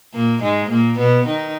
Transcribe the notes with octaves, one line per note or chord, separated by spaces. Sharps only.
A#2 A#3
G#2 G#3
A#2 A#3
B2 B3
D#3 D#4